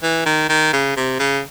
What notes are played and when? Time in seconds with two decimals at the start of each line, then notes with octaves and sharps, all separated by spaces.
0.03 E3
0.26 D#3
0.49 D#3
0.73 C#3
0.97 C3
1.19 C#3